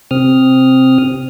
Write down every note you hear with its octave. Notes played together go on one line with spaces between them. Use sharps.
C3 C4 D#6 F6